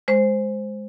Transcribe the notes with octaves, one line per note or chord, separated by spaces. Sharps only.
G#3 C5